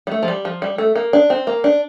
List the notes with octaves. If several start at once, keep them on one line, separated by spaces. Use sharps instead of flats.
G3
A3
F3
G3
F3
G3
A3
A#3
D4
C4
A#3
D4